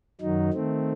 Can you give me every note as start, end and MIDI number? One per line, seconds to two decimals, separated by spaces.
0.21 0.50 42
0.21 0.50 51
0.21 0.50 54
0.21 0.50 63
0.53 0.92 51
0.53 0.92 57
0.53 0.92 60